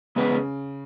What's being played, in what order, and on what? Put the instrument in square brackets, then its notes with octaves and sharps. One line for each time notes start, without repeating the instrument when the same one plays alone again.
[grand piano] C#3 [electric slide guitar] G#3 B3 G#4 B4
[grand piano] C#3